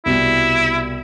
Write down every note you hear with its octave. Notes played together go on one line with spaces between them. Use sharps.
C2 B2 G3 E4